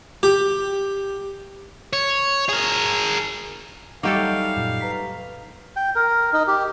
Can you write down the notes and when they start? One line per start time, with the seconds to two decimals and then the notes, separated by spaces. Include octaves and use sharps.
0.23 G4
1.93 C#5
2.49 G#4 A#4
4.03 F#3 G3 A3 D#4 G4 A4 F5 D6
4.56 F#2 A#2
4.81 B4 A#5 B6
5.76 G5
5.95 A#4
6.33 D#4
6.47 G4